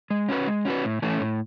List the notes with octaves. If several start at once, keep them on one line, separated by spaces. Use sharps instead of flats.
G#3
C#4 F#4 B4
G#3
C#4 F#4 B4
A2
E3 A3 C#4
A2